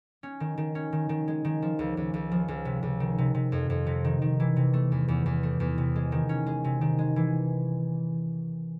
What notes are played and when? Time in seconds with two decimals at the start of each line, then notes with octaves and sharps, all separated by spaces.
0.23 C#4
0.40 D#3
0.58 D#3
0.75 C#4
0.93 D#3
1.09 D#3
1.28 G#3
1.45 D#3
1.62 F3
1.79 C#2
1.97 C#2
2.14 C#2
2.32 F3
2.48 C#2
2.65 C3
2.83 C#2
3.00 D#3
3.18 C3
3.35 C3
3.52 F2
3.70 F2
3.87 C3
4.04 D#3
4.22 D#3
4.40 E3
4.56 C3
4.73 A3
4.92 E2
5.08 E2
5.26 E2
5.43 A3
5.60 E2
5.78 C3
5.96 G#3
6.12 D#3
6.29 C#4
6.47 G#3
6.64 C3
6.81 D#3
6.99 G#3
7.16 E3